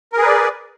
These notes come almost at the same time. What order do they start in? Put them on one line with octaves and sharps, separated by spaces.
A#4 G#4 B4 D5